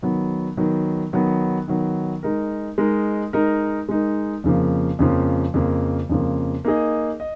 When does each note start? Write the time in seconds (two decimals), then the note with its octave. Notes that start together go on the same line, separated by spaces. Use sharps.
0.02 D#3 F#3 B3
0.57 D#3 F#3 B3
1.13 D#3 F#3 B3
1.68 D#3 F#3 B3
2.23 G#3 D#4 A#4
2.78 G#3 D#4 A#4
3.33 G#3 D#4 A#4
3.89 G#3 D#4 A#4
4.44 F2 C#3 F3 A#3
4.99 F2 C#3 F3 A#3
5.54 F2 C#3 F3 A#3
6.09 F2 C#3 F3 A#3
6.65 A#3 D#4 G#4 D#5
7.20 D#5